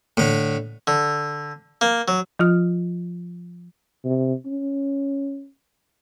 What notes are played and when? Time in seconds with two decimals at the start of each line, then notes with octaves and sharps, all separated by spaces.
0.17 A2 D3
0.87 D3
1.81 A#3
2.08 F#3
2.39 F3 F4 F6
4.05 C3
4.46 C#4